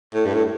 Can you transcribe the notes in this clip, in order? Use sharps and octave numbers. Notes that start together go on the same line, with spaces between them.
A2
G2
A2